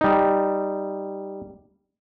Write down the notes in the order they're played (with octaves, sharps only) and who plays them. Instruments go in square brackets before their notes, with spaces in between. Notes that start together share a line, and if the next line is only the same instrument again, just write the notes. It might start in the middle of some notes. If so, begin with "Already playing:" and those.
[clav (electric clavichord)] G3 D#4